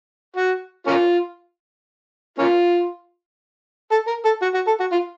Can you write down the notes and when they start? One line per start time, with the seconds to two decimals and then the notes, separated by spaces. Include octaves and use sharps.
0.36 F#4
0.87 A#3 C#4 F4
2.39 A#3 C#4 F4
3.91 A4
4.07 A#4
4.25 A4
4.42 F#4
4.54 F#4
4.67 A4
4.80 F#4
4.92 F4